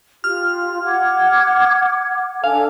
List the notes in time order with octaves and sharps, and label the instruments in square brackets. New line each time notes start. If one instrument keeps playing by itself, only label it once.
[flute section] F4 G4 [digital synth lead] F6
[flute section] F#5 D6 G#6
[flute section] D4 A4 G#5 [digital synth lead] F5